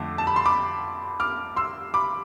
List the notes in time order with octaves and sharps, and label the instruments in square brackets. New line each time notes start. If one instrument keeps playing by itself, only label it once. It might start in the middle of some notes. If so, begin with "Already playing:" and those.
Already playing: [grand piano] F2 D3 A3 D6
A5
B5
C6
B5 D6
D6 F6
C6 E6
B5 D6